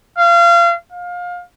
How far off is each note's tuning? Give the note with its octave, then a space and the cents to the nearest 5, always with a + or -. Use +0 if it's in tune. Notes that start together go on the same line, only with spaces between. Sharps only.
F5 -30
F5 +25